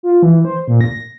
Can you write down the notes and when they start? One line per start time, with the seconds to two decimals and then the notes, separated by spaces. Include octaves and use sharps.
0.03 F4
0.23 E3
0.45 C5
0.68 A#2
0.81 A#6